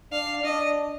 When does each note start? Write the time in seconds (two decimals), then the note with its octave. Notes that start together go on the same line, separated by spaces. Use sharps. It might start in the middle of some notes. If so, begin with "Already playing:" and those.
0.12 D4 F5
0.44 D4 D#5